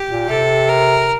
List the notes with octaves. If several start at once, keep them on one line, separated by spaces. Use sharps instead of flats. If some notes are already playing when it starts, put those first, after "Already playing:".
Already playing: G4
A#2
C3 A4
A#4